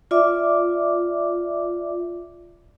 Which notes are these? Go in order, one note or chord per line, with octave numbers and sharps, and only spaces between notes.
F4 D5 E5 D6